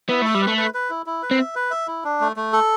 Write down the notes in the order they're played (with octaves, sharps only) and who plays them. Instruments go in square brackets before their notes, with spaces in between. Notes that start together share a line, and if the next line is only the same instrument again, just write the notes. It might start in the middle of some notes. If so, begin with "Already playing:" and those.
[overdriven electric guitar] B3 [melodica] E4
[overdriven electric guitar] A3 [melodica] E5
[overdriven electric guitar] G3
[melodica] B4
[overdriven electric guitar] A3
[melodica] B4
B4
E4
E4
B4
[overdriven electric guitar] C4
[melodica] E5
B4
E5
E4
D4
A3
A3
A4